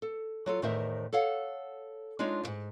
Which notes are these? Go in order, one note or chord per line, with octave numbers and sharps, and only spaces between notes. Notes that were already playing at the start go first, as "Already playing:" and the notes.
A4
F#3 F4 A4
E2 A2 D#3 A#4 C5 E5
A4 C#5 F5 F#5
G#3 D4 D#4 F4 C#5
F2 G#2